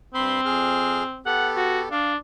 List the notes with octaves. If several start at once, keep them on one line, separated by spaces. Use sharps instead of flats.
G2 C4 B5 C6
F2 G#4 F6
B3 G4 A4 F#5
F#4
D4 F5